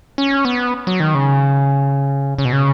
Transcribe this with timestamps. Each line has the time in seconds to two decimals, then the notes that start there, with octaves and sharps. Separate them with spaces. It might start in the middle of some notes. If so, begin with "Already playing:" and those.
0.18 C#4
0.45 B3
0.87 F#3
1.00 D#3
1.15 C#3
2.38 C#3
2.45 B2
2.53 C#3